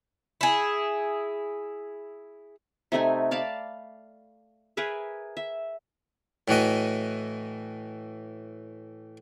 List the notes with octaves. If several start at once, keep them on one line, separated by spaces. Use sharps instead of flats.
E4 G#4
C3 A3 D#4 G#5
D5 F5 A5 B5
G#4 A#4 B4 E5
E5
A2 E3 F#4 D#5